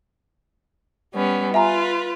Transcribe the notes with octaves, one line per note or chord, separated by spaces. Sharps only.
G3 B3 C#4
F4 B4 E5 G#5 A#5